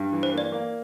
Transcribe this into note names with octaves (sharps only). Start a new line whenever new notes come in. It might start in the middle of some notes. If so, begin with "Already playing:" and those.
Already playing: G2
E3
C5
A#3
D5
A#3